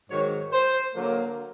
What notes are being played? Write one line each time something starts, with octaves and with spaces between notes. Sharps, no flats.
G#2 D#3 F#3 C#5
C5
D3 F#3 A#3